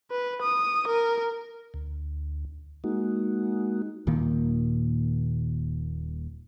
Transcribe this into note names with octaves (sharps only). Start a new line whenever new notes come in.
B4
D#6
A#4
D2
G#3 A#3 D#4 F#4
D#1 A#2 D#3 A#3